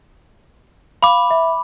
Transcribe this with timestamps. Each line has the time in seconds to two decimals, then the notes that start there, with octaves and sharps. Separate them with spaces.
1.03 F5 B5 D6
1.31 E5